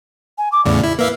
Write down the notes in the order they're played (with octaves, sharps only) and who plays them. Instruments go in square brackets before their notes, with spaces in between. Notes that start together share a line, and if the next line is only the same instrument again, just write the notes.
[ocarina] G#5
D6
[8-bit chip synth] E2 A2 C#3 [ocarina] D5
[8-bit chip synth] E4
[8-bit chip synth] A#3 E5 F5 [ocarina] B4